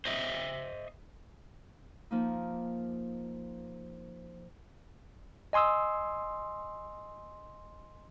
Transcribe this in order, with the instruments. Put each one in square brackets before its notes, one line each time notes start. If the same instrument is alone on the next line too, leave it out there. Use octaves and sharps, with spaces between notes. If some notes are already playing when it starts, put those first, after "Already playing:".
[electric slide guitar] C5 D#5 E5
[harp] F3 A#3 D#4
[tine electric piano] D#5 G#5 C6 D#6 E6